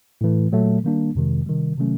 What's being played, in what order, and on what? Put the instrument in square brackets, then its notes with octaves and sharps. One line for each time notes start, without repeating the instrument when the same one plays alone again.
[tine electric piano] A2 E3 A3
A#2 F#3 A3
D#3 G3 A#3 D4
F2 C3 D#3 G#3
C3 D#3 G3
C3 D#3 F#3 A3 C#4